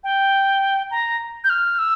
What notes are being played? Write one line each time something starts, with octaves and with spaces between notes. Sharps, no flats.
G5
A#5
G6
F6
E6